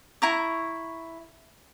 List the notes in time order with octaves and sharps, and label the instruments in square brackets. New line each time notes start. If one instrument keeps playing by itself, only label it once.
[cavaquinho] E4 A#5 C#6